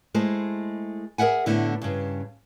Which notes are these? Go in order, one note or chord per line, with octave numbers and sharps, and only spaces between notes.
G#3 A3 E4 G#4 C5
G#4 A#4 E5 F#5 G#5
A2 D3 A3 B3 E4
G2 C#3